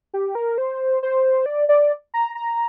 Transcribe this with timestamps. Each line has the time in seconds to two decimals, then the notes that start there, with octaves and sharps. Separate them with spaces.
0.14 G4
0.35 A#4
0.58 C5
1.03 C5
1.46 D5
1.69 D5
2.14 A#5
2.35 A#5